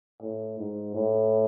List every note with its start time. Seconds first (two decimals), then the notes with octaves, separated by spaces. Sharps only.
0.22 A2
0.59 G#2
0.95 A2